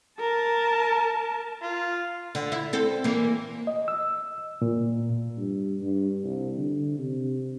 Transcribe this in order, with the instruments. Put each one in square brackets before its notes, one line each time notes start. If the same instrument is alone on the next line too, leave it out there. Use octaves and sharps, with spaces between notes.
[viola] A#4 A5
[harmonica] F4
[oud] D3
E4
C4 A4
E3 A#3
[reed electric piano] D#5
E6
A#2
[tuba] G2
G2
C2
D3
C3